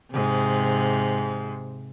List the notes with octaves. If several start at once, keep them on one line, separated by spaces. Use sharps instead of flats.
G#2 C3